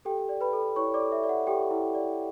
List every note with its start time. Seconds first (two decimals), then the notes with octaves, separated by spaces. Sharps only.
0.05 G4 A4 G5
0.29 D5
0.41 B4 B5
0.53 A4
0.76 E4 C#5 C#6
0.94 D5 D6
1.00 A4
1.12 E5
1.24 D5
1.29 F#5
1.47 G4 A4 G5
1.71 E4
1.94 D5